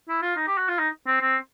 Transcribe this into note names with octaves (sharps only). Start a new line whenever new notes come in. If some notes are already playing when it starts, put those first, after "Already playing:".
E4
F4
D#4
G4
F#4
F4
D#4
C4
C4